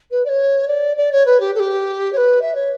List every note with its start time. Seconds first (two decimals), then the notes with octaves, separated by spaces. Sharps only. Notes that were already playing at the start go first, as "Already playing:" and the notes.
0.10 B4
0.25 D5
0.28 C#5
0.67 D5
0.96 D5
1.11 C#5
1.25 B4
1.39 G4
1.54 A4
1.59 G4
2.12 C#5
2.16 B4
2.41 E5
2.54 C#5